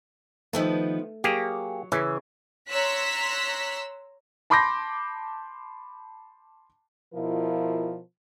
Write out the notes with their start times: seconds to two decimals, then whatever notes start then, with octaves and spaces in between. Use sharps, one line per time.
0.53 D#3 F3 A3 B3
1.24 F#3 A#3 G4 G#4
1.92 C#3 E3 C#4
2.69 C#5 A#5 C6 E6 F#6 B6
4.50 A5 B5 C6 D6 G6 A#6
7.14 B2 F3 E4 F4 A#4